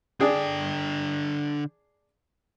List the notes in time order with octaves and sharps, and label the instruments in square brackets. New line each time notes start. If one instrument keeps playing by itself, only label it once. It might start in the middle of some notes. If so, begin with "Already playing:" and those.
[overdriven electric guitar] D3 G5 [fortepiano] D4 G#4